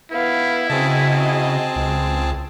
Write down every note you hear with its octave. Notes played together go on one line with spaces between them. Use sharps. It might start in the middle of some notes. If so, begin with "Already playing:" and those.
B3 E4 F5
C#3 C4 F#4 G#4 D#5 A5
C#2